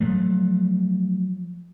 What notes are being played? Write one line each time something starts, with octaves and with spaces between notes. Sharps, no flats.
F3 F#3 A3